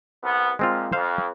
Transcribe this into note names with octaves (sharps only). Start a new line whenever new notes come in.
C2 B3
A#2 F3 G#3 C4 F4
F2 C5 F5